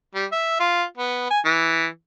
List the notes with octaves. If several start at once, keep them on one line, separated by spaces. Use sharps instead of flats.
G3
E5
F4
B3
G#5
E3